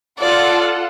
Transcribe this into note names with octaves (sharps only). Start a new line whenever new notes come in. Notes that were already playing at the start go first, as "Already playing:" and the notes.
F4 A4 D5 F#5